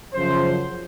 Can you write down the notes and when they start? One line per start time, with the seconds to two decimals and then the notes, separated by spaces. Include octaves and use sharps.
0.13 F#2 C#3 F3 C5